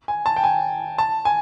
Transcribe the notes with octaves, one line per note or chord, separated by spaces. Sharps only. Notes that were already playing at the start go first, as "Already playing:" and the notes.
G#5
A5
G5
G#5
A5
G#5